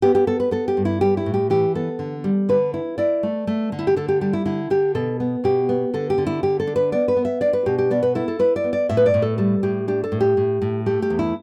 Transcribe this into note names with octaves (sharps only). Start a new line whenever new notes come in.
B3 G4
G4
B3 A4
B4
B3 A4
G4
G2
E4
G3 G4
E4
A2
G4
E3 G4
B3 A4
D3
G3
D3 B4
E4
E4 D5
A3
A3
D3
E4
G4
D3 A4
G4
G3 G4
E4
D3 E4
D3 G4
B2 A4
B3
B2 G4
B3
D3 A4
G4
D3
E4
D3 G4
A4
D4
B4
B3 D5
B4
B3
E5
D4 D5
B4
B2 G4
G4
B3 D5
B4
E4 A4
A4
E4 B4
D5
B3
D5
A2 E5
B4
D5
A2
A4
G3 A4
A2 G4
D4 G4
A4
A2
G4
A2
A2
A3 G4
G4
E2
E4